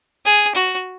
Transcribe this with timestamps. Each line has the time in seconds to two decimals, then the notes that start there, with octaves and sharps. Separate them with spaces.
0.25 G#4
0.55 F#4